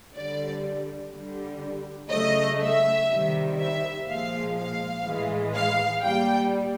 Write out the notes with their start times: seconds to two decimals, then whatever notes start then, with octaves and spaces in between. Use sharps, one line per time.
0.15 D3 G3 D5
1.12 D3 G3
2.11 C#3 F#3 A3 D#5
2.60 E5
3.09 C3 D#3 G3
3.58 E5
4.07 A#2 F3 G#3 F5
4.57 F5
5.05 A2 E3 G#3
5.54 F5
6.03 A#2 G3 G5